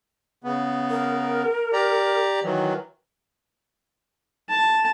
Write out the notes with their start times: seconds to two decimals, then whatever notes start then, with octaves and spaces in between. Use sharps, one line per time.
0.44 C#3 B3
0.90 A#4
1.73 G4 D5 A#5
2.44 D#3 E3 F#3
4.49 A5